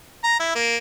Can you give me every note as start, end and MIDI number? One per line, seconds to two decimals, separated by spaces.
0.24 0.37 82
0.40 0.50 64
0.55 0.77 58